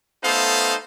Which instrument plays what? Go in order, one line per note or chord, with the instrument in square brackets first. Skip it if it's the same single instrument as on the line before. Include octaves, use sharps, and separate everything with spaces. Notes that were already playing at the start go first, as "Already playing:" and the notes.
[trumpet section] A3 B3 D#4 A4 C5 F5